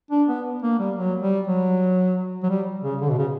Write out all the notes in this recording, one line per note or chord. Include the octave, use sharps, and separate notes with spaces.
D4
B3
A#3
G3
F#3
G3
F#3
F#3
G3
C#3
D3
B2
C#3